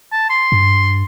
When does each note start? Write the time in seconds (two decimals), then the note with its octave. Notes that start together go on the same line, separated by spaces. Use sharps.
0.12 A5
0.30 C6
0.52 G2